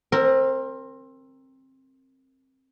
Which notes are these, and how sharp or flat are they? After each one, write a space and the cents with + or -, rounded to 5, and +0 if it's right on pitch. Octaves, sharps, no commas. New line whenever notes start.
C4 +20 A#4 -10